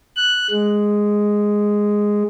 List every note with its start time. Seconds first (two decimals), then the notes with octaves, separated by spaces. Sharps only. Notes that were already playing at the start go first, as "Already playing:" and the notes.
0.16 F#6
0.50 G#3